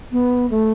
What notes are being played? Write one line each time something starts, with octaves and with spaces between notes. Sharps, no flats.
B3
A3